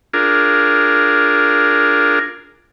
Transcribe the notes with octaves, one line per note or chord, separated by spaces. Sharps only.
D4 F4 G#4 A#4